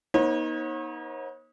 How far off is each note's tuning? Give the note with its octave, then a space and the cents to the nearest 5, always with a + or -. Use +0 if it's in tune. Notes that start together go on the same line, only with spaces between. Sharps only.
B3 -40 D#4 +20 C#5 -45